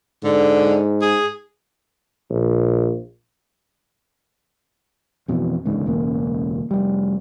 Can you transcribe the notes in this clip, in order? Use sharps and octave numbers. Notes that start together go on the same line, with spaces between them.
G#2 D3
G#4
A#1
F2 B2 E3
E1 C#2 G#2 D3
E1 C#2 A#3
F1 G3